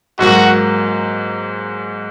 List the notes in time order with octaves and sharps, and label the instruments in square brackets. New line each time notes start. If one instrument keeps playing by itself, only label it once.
[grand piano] G#2 F#3 A#3 [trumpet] F#4